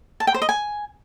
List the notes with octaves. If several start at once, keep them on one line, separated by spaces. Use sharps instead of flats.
A5
G5
C5
D#5
G#5